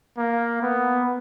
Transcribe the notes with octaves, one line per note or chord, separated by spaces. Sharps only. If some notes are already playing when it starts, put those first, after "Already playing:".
A#3
B3